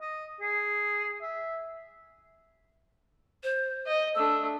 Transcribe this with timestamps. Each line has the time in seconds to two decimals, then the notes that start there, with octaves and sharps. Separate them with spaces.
0.01 D#5
0.41 G#4
1.22 E5
3.43 C5
3.87 D#5
4.15 A3 D4 E6